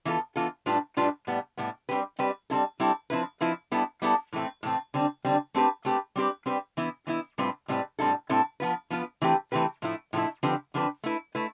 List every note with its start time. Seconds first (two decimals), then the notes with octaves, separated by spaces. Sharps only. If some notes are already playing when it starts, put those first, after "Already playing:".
0.05 E3 B3 F4 A4
0.36 E3 B3 F4 A4
0.66 A2 G3 D4 F4 B4
0.97 A2 G3 D4 F4 B4
1.27 A2 G3 B3
1.57 A2 G3 B3
1.89 G3 C4 G4 B4
2.19 G3 C4 G4 B4
2.50 G3 C4 E4 A4
2.80 G3 C4 E4 A4
3.10 F3 C4 E4 B4
3.41 F3 C4 E4 B4
3.71 G3 B3 E4 A4
4.02 G3 B3 E4 A4
4.33 A2 E3 A3 C4
4.63 A2 E3 A3 C4
4.94 D3 G3 C4
5.25 D3 G3 C4
5.54 A3 C4 G4 B4
5.85 A3 C4 G4 B4
6.16 G3 C4 G4 B4
6.46 G3 C4 G4 B4
6.77 E3 B3 E4
7.07 E3 B3 E4
7.38 A2 G3 C4 F4 B4
7.68 A2 G3 C4 F4 B4
7.99 A2 G3 C4 E4 A4
8.29 A2 G3 C4 E4 A4
8.60 F3 B3 F4 B4
8.90 F3 B3 F4 B4
9.22 E3 A3 C4 G4 B4
9.52 E3 A3 C4 G4 B4
9.82 A2 F3 A3 E4
10.13 A2 F3 A3 E4
10.43 D3 F3 C4 G4 B4
10.74 D3 F3 C4 G4 B4
11.04 A3 E4 B4
11.35 A3 E4 B4